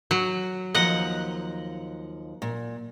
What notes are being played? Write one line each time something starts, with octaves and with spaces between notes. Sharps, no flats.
F#3
D#2 F3 D#5 F#5 A#5
A#2